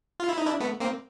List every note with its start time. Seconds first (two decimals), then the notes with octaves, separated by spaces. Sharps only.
0.20 F4
0.29 E4
0.38 D#4
0.46 D4 E4
0.60 A3 B3
0.80 A#3 C4